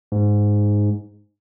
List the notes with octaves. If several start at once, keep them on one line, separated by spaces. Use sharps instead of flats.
G#2